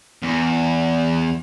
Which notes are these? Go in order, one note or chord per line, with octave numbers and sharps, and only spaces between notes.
E2